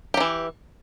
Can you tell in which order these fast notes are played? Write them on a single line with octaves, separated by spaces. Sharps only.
G4 F#3 E3